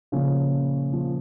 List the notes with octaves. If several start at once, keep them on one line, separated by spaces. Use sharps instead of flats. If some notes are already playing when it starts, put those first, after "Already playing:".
A#2 C#3 F3 C#4
A#2 F3